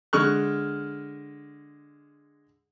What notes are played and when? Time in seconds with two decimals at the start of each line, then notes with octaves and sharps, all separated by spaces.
0.13 D3 G#3 C#6 F6 F#6